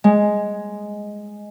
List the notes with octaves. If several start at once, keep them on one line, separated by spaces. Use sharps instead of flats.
G#3